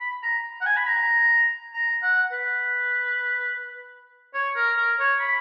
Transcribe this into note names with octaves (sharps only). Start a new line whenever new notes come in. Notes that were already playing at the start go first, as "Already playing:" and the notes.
B5
A#5
F#5
G#5
B5
A#5
A#5
F#5
B4
C#5
A#4
A#4
C#5
B5